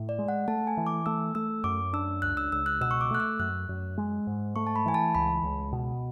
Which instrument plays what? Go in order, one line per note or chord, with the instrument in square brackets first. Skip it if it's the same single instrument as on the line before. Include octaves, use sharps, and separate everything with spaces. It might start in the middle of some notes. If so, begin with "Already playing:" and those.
Already playing: [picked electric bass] A2
[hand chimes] D5
[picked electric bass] G#3
[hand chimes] F#5
[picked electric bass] A3 [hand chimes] A5
[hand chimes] G#5
[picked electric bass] E3
[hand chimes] D6
[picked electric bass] A3 [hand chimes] E6
[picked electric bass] A3 [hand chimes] E6
[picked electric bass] F#2 [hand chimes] D6
[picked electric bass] D4 [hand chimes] E6
[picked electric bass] C#2 [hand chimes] F#6
[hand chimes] E6
[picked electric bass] C#2 [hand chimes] E6
[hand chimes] F#6
[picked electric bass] B2 [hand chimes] E6
[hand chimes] C#6
D6
[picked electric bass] A3 [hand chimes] F#6
[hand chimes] E6
[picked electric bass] F#2 [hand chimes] F#6
[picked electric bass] F#2
G#3
G#2
[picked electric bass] A3 [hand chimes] C#6
[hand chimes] A5
B5
[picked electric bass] E3 [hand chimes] G#5
[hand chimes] A5
[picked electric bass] C#2 [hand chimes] B5
[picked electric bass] C#2
B2